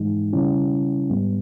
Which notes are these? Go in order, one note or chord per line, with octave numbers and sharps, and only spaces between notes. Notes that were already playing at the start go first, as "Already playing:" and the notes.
Already playing: G#2 E3 G#3 D#4
C#3 G3 C#4 E4
G#2 G3 B3